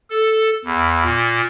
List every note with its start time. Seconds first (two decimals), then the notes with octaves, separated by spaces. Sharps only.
0.10 A4
0.65 E2
1.04 A#2